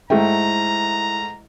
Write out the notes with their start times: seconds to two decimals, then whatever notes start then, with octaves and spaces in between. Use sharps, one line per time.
0.10 G#2 A3 E4 G5 A#5